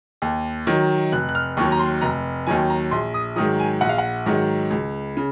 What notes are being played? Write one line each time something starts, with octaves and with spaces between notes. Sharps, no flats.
D#2
D#3 F#3
F1 F#6
F#6
F6
D#2 D#3 F#3 C#6
A#5
C6
F1 A#5
D#2 D#3 F#3 G#5
A#5
A#1 C6
D#6
G#2 D#3 F#3 D#6
G#5
A#1 F#5
F5
F#5
G#2 D#3 F#3
C#2
C#3